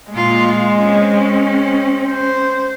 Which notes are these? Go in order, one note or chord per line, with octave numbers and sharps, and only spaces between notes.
A#2 G#3 F4
C4 C#4
C5